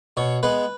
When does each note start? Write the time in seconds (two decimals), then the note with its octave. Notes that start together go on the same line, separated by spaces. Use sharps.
0.17 B2 C#5
0.43 G#3 B3 B4